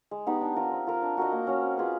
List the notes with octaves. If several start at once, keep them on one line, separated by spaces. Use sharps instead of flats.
G#3
B3 D#4 G4
D4
F4 A#4 D#5
C4
F4 A#4
D4
F#4 A#4 D#5
A#3
C#4 F#4
C4
F4 G#4 B4